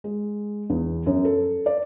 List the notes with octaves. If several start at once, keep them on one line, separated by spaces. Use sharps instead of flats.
G#3
E2
F#2
A4
D5